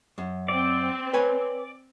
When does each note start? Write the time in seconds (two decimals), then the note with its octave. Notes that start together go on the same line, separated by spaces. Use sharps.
0.18 F#2
0.48 C4 D5
1.13 B4 C#5 G#5